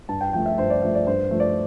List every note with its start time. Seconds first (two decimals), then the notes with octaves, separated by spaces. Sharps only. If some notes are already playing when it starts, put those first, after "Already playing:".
0.09 G2 A5
0.21 G5
0.33 F3 A3 G5
0.46 E5
0.58 G2 C5
0.70 D5
0.82 F3 A3 E5
0.95 D5
1.07 G2 C5
1.31 F3 A3
1.40 D5